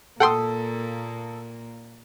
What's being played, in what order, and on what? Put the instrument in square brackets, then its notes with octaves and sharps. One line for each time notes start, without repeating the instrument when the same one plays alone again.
[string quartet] A#2 A#3 [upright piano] A4 D#6 [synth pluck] F#5 G5 C6